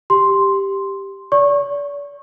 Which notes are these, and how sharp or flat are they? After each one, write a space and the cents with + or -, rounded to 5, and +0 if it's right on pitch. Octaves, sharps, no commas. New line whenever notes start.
G4 +0 C6 +0
D5 -40 C#6 -20